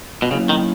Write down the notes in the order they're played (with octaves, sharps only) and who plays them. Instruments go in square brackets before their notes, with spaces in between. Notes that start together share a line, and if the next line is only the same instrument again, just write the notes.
[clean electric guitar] B2
[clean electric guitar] C#3 [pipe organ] F#3 A#3 C#4 E4
[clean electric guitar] D#3